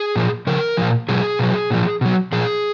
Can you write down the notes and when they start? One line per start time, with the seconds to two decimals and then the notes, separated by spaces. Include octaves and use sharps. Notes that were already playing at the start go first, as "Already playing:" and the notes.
Already playing: G#4
0.16 A#2 F3
0.47 C#3 F3 A#4
0.77 A#2 F3
1.09 B2 F#3 G#4
1.39 B2 F#3
1.70 A#2 F3
2.01 B2 F#3
2.32 A#2 F3 G#4